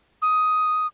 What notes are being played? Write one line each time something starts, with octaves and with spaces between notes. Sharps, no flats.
D#6